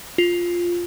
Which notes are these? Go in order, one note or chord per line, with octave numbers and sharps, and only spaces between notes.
F4